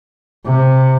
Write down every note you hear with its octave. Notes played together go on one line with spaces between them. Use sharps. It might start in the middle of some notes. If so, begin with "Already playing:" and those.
C3